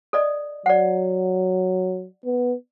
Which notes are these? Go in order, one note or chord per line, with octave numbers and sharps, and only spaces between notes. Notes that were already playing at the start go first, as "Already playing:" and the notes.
A4 D5 D#5
F#3 D5 F#5
B3